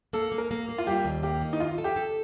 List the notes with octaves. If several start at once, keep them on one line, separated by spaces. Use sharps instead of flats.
A#3 A4
A#3
A#4
A#3
A#3
F4
G3 G4
D#2
A#3 G4
D#3
D#4
F3 F4
A4
G4
A4